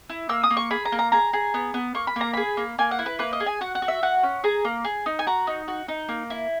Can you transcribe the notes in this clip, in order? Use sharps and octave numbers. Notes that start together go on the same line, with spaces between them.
E4
A#3 E6
D#6
A#3
C#6
G#4 B5
A#5
A#3
A#5
G#4 A#5
G#4
B3
B3
A#3 C#6
B5
A#3 A#5
G#4 B5
A#3
A#3 G#5
F#5
E4
B4
A#3 B4
D#5
G#4
G#5
F#4 F#5
F#5
F#4
E5
F#4 F#5
C#4
G#4 A#5
A#3
G#4
D#4
G#5
F#4 A#5
D#4
F#4
D#4
A#3
E4